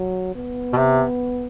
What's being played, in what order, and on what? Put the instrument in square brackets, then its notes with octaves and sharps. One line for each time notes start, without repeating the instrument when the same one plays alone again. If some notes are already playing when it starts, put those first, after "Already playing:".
Already playing: [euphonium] F#3
B3
[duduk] B2
C3